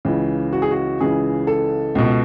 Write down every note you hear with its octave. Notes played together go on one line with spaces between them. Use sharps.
C#2 C#3 E3
F#4
G#4
F#4
C#2 C#3 E3 G#4
A4
C#2 B2